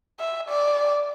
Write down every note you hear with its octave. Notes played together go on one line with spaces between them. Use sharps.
E5
D5